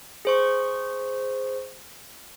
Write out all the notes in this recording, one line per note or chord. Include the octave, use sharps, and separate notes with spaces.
G#4 C5 C#6